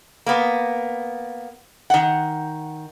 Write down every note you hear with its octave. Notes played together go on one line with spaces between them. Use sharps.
A#3 B3
D#3 F#5